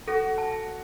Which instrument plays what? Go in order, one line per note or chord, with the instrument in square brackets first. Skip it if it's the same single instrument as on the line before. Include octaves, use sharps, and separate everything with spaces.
[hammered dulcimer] F#4 [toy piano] A4
[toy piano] A5